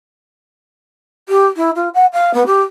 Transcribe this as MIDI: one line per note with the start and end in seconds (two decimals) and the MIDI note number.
1.29 1.45 67
1.56 1.70 64
1.75 1.89 65
1.94 2.06 78
2.13 2.33 77
2.33 2.43 59
2.46 2.61 67